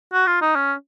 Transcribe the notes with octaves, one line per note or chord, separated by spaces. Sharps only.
F#4
F4
D#4
C#4